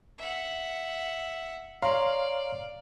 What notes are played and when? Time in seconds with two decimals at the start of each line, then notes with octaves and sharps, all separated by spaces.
0.18 E5 F#5
1.82 C#5 D5 F5 A#5 C6